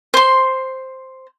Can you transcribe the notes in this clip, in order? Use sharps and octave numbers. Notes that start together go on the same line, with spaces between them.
C5 C6